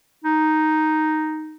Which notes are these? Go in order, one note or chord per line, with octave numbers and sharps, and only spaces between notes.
D#4